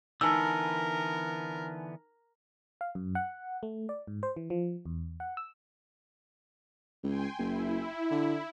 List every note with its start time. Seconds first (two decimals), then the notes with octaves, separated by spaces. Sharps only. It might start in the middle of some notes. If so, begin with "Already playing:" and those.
0.21 D3 E3 B3 D#4 A#4 G#5 A5 E6
2.81 F5
2.95 F#2
3.15 F#5
3.63 A3
3.89 D5
4.07 G#2
4.23 C5
4.36 E3
4.50 F3
4.86 E2
5.20 F#5
5.37 E6
7.04 C#2 G5 G#5 C6
7.39 F#1 E4
8.11 D3